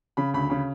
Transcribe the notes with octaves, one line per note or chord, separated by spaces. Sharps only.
C#3 B5
D2 B5
C#3 B5